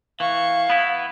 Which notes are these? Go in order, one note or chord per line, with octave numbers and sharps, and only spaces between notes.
E3 F5 C#6
B3 E4